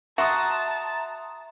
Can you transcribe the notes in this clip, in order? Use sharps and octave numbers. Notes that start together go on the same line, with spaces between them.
F#4 E5 A5 A#5 C6 D#6